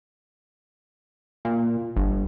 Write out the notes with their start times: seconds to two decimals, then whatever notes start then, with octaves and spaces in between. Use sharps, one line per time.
1.45 A#2
1.96 G1